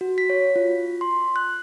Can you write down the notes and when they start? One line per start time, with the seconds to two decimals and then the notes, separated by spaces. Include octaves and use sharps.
0.01 F#4
0.18 B6
0.30 C#5
0.56 F4
1.01 C6
1.36 F#6